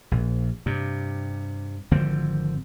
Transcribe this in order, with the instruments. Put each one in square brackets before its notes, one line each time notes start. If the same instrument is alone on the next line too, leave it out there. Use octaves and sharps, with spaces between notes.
[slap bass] A#1
G2 C3
G#1 D3 F3 C4